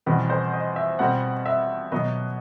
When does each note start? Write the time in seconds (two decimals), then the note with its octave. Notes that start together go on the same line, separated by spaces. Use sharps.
0.06 E2 B2 G3 C4 B4
0.30 C5
0.53 D#5
0.76 E5
0.99 B2 G3 C4 F#5
1.46 E5
1.92 B2 F#3 B3 D#5